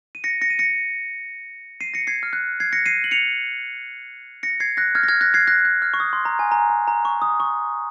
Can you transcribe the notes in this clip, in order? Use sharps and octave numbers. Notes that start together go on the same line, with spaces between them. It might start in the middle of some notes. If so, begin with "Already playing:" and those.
D#7
A#6 C#7
A#6 C#7
D#7
A#6 C#7
C7 D#7
A#6 C#7
G#6 C7
F6
F#6
G#6 C7
A#6 C#7
C7 D#7
F#7
C#7 F7
A#6 C#7
G#6 C7
F#6 A#6
F6 G#6
A#6
F6 G#6
F#6 A#6
G#6 C7
F#6 A#6
F#6
F6
C#6
D#6
C6
A#5
G#5
A#5
A#5
A#5
C#6
D#6
C#6